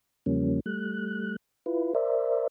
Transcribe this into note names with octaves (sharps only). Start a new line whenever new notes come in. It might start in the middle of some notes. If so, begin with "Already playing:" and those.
E2 C#3 F3 G3 A#3 C#4
G3 A3 F#6
E4 F4 B4
A#4 C5 D5 E5